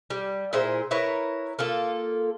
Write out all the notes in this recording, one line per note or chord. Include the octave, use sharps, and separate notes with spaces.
G3
A#2 E4 G#4 C5
E4 A#4 B4 C#5
A#3 F4 A4